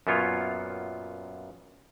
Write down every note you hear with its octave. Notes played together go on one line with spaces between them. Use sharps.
F#2 A#2 B3 F4 C#5